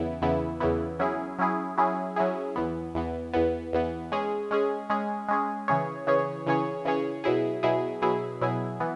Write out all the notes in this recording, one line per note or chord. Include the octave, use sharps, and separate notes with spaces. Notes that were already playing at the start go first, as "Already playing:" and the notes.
Already playing: E2 C#3 E3 B3 E4
E2 C#3 E3 B3 E4
E2 C#3 E3 B3 E4
F#3 C#4 E4 G#4
F#3 C#4 E4 G#4
F#3 C#4 E4 G#4
F#3 C#4 E4 G#4
E2 E3 B3
E2 E3 B3
E2 E3 B3
E2 E3 B3
G#3 C#4 G#4
G#3 C#4 G#4
G#3 C#4 G#4
G#3 C#4 G#4
C#3 E3 C#4 G#4 C#5
C#3 E3 C#4 G#4 C#5
C#3 E3 C#4 G#4 C#5
C#3 E3 C#4 G#4 C#5
B2 F#3 E4 G#4
B2 F#3 E4 G#4
B2 F#3 E4 G#4
B2 F#3 E4 G#4
E3 B3